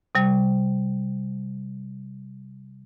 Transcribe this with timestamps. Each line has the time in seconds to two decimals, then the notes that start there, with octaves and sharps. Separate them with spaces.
0.15 C3 G3